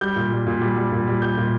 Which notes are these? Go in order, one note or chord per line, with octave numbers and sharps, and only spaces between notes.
G3 G6
A#2
G3
A#2
G3
G3
A#2
G3
G3 G6
A#2